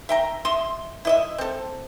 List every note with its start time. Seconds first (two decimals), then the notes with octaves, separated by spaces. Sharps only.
0.09 E5 G5 A#5
0.45 D#5 E5 C6
1.05 E4 D#5 E5
1.38 C4 A4